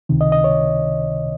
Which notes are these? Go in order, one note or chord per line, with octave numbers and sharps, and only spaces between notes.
C#2 C3 D#3
D#5
D#5
C#5